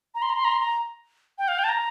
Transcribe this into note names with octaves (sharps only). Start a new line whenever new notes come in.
A#5
C6
A#5
C6
A#5
C6
A#5
G5
F5
G5
A5
A#5